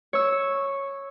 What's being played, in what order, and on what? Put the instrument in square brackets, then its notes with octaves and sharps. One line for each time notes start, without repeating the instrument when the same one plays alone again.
[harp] C#5 E6